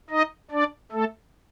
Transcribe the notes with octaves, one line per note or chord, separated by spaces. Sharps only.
D#4 D#5
D4 D5
A3 A4